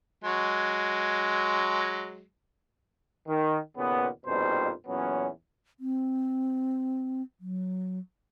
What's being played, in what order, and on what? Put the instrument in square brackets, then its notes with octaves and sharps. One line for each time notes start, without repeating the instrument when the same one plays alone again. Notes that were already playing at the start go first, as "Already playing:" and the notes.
[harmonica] F#3 G#3
[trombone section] D#3
D#2 A#2 C#3 B3
A#1 F2 B2 G3 D#4 C5
E2 A#2 F#3 B3 C#4
[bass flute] C4
F#3